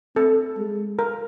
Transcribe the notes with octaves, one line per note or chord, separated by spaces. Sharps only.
C4 A4
G#3
A#4